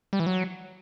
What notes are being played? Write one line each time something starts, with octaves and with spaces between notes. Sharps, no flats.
G3
E3
F#3